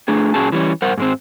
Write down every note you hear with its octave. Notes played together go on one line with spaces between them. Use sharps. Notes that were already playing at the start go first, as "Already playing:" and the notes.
A3 D4 G#4
A#2 F#3 C#4 G#4 A5
E3 G3 C#4
G2 A#4 C5 F#5
G#2 G#3 C4